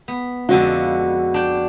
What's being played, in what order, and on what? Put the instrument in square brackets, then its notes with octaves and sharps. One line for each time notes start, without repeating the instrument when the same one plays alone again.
[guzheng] B3
[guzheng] F2 D3 G#3 [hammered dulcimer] F#4
[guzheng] D4 G5